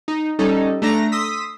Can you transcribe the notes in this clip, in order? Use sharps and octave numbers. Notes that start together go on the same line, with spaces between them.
D#4
G3 C#4 D#4 A4
A3 D4 A#5 A#6
C6 D#6 E6 B6